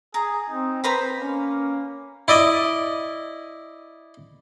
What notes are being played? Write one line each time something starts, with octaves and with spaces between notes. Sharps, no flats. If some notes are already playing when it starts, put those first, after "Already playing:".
G#4 A#5
C4 D#4
B4 C5 A#5 B5
A#3 C#4
E4 D5 D#5